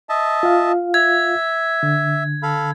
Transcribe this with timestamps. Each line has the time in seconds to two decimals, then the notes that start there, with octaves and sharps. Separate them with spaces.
0.09 D#5 E5 A5
0.43 F4 F5
0.94 E5 G#6
1.83 D3
2.43 A4 F5 B5